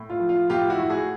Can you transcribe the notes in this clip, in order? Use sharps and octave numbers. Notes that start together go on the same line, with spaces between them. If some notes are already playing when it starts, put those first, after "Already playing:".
Already playing: A2
F4
F3
F4
A2 F4 G4
E4 F#4
A2
F#4 G#4